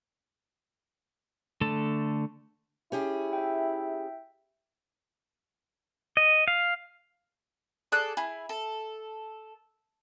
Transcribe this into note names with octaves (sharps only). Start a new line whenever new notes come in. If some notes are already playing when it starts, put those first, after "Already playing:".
D3 A3 A4 A5
C#4 E4 G4 G#4
E5 G5
D#5
F5
G#4 A4 D5 F#6
E4 G#4
A4